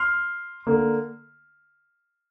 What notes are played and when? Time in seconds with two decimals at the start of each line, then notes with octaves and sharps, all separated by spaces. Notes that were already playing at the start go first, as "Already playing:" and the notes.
Already playing: C6 F6
0.67 D3 A#3